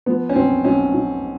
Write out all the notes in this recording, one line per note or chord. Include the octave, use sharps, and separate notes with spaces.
F3 B3
C#4
B1 C4
B1 C#4
B1